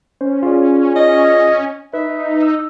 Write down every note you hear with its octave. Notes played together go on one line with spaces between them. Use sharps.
C#4 C5
F4 G#4 D5
C#4 D#5
D#4 B4 E5
E6